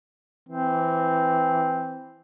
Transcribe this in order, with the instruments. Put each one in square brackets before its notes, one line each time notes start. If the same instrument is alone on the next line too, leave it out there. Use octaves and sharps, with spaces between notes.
[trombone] E3 [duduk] C4